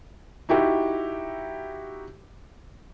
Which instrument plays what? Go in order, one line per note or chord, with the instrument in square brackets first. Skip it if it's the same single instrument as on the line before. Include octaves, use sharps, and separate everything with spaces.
[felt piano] D#4 E4 F#4 G4 E5